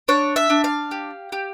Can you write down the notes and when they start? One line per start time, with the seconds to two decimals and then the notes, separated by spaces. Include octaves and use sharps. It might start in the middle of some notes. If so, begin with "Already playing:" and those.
0.08 D4 C#5
0.36 E5
0.50 D4
0.64 F5
0.91 G4
1.32 G4